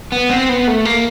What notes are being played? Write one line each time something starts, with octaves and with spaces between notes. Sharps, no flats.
B3
C4
B3
A3
A#3